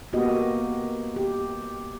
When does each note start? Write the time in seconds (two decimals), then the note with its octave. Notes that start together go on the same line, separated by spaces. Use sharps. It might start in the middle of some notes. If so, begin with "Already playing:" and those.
0.13 A#3 B3 F#4 G4 D#5
1.16 G4